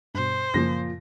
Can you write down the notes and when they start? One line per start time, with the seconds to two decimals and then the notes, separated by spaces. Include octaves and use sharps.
0.15 G2 B2 C5
0.54 F#2 A#2 C#3 F3 A#6